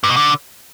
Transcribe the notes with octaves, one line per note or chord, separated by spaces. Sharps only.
G2
B2
D3